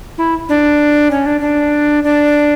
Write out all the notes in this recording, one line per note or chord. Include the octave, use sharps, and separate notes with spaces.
E4
D4
C#4
D4
D4
D4